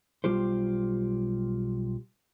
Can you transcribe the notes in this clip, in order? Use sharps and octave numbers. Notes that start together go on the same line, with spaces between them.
B1 G3 F4 G4 C5